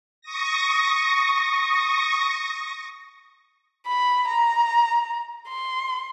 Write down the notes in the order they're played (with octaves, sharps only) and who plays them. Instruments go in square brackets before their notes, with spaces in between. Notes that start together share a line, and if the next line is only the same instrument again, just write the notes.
[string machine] C#6 D#6 A#6
[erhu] B5
A#5
C6